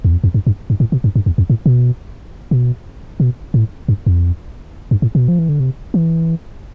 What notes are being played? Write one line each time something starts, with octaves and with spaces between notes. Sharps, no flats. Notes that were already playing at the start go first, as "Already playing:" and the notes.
E2
F2
F2
G2
G2
G2
A2
B2
G2
G2
E2
F2
A2
B2
B2
B2
A2
G2
F2
G2
A2
B2
F3
E3
D3
C3
E3